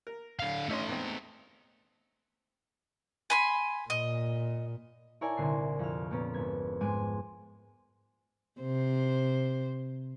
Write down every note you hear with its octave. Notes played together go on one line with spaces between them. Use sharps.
A#4
D3 F5
A3 C#4 D#4 E5 C6
E2 G#2 C4
G#5 B5 C6
A#2 D#5
E4 A#4 C#5 D5 G#5 A5
C2 A#2 D3 C7
F2 F6
A#2 A#3 B3 C#4
G#1 G#6 B6
G#2 G#3 G#5 D6 D#7
C3 C5